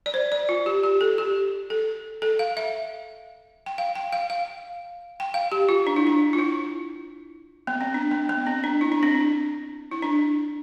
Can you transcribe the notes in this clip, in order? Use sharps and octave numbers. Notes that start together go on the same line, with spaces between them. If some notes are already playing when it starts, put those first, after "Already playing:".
D5
C5
D5
F4
G4
G4
A4
G4
A4
A4
F5
E5
G5
F5
G5
F5
F5
G5
F5
G4
F4
D4
E4
D4
F4
E4
B3
C4
D4
B3
B3
C4
D4
E4
D4
C4
D4
E4
D4